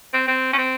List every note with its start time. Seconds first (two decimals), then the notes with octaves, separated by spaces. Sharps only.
0.13 C4
0.28 C4
0.53 C#4
0.58 C4